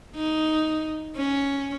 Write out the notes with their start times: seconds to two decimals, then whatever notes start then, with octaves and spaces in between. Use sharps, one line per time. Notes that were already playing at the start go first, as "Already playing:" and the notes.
0.16 D#4
1.16 C#4